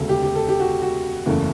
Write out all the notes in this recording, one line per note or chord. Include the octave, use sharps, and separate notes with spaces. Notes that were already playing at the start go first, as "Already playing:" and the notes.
Already playing: E1 D2 C#3 A4
G4
G4
A4
G4
F#4
F#4
F#1 E2 C#3 E3 A3